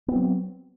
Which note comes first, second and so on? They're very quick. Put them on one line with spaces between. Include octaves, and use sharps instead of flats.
B3 C4 F#3